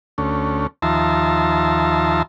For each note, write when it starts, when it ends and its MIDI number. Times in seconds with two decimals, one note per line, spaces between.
0.18 0.67 38
0.18 0.67 57
0.18 0.67 61
0.82 2.22 39
0.82 2.22 53
0.82 2.22 76
0.82 2.22 81
0.82 2.22 82
0.82 2.22 84